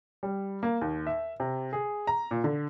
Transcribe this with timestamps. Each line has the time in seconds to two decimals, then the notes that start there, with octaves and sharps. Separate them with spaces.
0.23 G3
0.63 A#3
0.81 D#2
1.07 E5
1.40 C3
1.73 G#4
2.07 A#5
2.31 A#2
2.44 D3